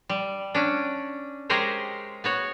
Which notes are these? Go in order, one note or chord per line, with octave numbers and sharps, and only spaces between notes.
G3
C#4 D4
G#3 G4 G#4 A#4 C5 C#5
B3 F#4 C#5